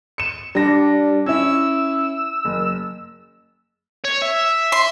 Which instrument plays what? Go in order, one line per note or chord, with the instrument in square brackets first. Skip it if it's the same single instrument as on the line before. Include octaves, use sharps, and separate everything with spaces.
[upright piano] C#7 E7
[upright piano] G3 A#6 [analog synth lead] D4
[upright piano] C#4 E4 [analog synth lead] E6
[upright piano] F#1
[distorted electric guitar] C#5
E5
[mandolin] C6